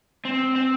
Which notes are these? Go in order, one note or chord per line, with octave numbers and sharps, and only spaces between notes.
C4
C4